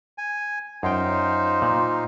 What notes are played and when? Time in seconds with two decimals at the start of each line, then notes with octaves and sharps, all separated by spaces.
0.18 G#5
0.83 F#2 D#4 F4 C5 G5
1.62 A#2